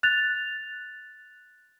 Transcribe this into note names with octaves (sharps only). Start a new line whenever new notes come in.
F#6 A6 F7